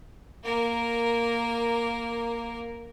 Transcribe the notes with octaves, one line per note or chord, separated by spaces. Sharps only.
A#3 A#4